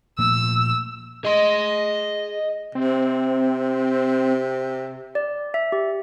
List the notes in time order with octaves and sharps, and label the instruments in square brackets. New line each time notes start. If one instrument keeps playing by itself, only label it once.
[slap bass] A#2 F3 A3 [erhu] E6
[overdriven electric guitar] G#4 C6 [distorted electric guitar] D#5
[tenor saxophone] C3 [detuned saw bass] C4
[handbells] D5
E5
G4